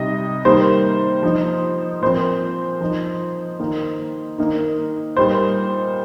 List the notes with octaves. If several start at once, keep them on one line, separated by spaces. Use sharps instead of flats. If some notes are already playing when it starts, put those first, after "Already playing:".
Already playing: C3 G3 D#4 D#5
D#3 G3 A#3 C5
F3 D#4
A#2 F3 C4 C5
F3 D#4
D#3 A#3 D#4
D#3 A#3 D#4
A#2 G3 D#4 C5